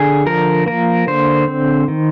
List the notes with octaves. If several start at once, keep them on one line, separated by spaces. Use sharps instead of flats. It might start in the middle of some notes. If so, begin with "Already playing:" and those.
Already playing: D3 G#4
F3 A#4
A#3 A#4
D3 C5
C4
D#3